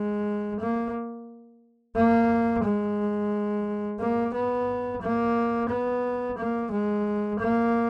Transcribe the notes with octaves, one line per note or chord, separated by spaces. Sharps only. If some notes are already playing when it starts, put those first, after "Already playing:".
Already playing: G#3
A#3
A#3
G#3
A#3
B3
A#3
B3
A#3
G#3
A#3